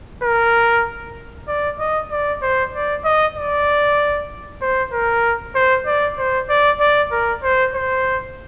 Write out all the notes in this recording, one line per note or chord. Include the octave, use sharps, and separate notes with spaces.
A#4
D5
D#5
D5
C5
D5
D#5
D5
C5
A#4
C5
D5
C5
D5
D5
A#4
C5
C5